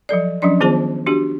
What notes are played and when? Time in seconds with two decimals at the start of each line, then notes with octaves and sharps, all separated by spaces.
0.09 F3 F#3 A4 D5
0.42 F3 F#3 C#4 D4 D5
0.60 D#3 B3 F4 G#4 C5 A5
1.07 D4 F#4 G4